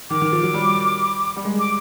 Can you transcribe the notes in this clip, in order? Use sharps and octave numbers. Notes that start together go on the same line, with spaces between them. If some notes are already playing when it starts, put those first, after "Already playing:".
D#3 D6
D#3
F3
F#3
G3
G3
G#3
D6